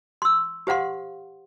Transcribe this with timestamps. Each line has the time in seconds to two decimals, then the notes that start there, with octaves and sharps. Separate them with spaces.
0.22 C6 E6
0.67 G4 C5 F5 F#5 C6